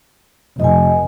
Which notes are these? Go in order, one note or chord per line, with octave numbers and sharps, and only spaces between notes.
F1 D#5 G#5